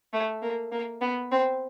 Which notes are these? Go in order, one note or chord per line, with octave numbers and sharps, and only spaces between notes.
A3
A#3
A#3
B3
C4